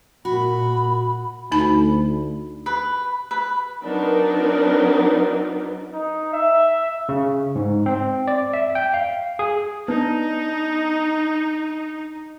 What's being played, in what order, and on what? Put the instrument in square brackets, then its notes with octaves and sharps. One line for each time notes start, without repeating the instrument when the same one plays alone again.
[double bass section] A#2 [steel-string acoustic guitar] F#4 [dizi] B5
[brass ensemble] D2 [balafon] D#4 B5
[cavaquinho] B4
B4
[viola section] F#3 C4 D4 D#4 A#4 B4
[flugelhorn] D#4
E5
[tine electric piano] C#3
G#2
C4
D5
E5
G5
F5
G#4
[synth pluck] B3 [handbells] D4 [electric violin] D#4